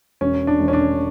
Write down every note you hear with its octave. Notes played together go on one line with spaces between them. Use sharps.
E1 C#4
D4
E1
C#4
D4